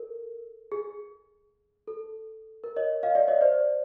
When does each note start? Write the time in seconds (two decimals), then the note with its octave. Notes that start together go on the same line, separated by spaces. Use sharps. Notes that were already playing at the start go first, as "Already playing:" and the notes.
Already playing: A4 A#4
0.72 G#4
1.88 A4
2.64 A#4
2.76 C#5 D#5
3.03 D#5 F5
3.15 D5 E5
3.28 C#5 D#5
3.41 C5 D5